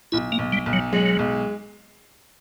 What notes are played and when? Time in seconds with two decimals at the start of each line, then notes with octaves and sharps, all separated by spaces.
0.12 B1 E4
0.32 A#3
0.39 B1
0.52 G3
0.66 B1
0.73 F#3
0.93 F#3 G#3
1.19 B1